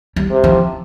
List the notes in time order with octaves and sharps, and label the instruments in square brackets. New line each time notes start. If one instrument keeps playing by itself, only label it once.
[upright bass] G3
[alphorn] C3
[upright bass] F3